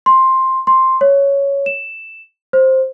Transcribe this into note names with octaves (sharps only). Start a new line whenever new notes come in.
C6
C6
C#5
E7
C5